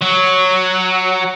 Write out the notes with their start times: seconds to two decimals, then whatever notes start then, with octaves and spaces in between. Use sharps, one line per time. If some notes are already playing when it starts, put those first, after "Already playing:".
0.02 F#3